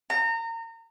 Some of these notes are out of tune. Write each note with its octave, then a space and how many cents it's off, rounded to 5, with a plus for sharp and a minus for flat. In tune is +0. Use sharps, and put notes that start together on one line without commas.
A#5 -30